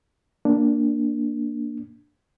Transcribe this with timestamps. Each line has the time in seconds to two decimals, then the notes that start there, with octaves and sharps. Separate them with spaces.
0.45 A#3 D4